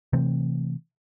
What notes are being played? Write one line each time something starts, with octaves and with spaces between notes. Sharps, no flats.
C3 E3 A3 C4